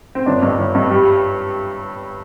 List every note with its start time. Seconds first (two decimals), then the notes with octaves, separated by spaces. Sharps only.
0.15 C4
0.26 G1 D4
0.42 G2
0.58 G1
0.75 G2
0.90 G3